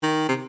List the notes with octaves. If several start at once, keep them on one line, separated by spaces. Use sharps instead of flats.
D#3
C3